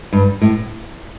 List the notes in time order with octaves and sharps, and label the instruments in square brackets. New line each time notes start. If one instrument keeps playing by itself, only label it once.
[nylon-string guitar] G2
A2